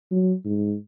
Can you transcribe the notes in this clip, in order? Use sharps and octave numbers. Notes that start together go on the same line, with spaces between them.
F#3
G#2